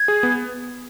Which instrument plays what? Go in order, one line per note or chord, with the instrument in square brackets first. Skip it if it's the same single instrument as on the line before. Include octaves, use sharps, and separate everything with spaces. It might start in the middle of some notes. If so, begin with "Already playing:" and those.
Already playing: [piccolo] G#6
[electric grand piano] G#4
B3